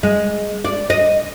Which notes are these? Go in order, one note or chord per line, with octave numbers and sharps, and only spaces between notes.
G#3
D5
D#5